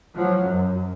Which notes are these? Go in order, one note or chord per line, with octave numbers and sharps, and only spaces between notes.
F3 F#3
F#2